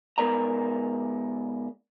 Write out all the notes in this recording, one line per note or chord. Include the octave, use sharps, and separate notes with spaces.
G#2 B3 A#4 D5 A#5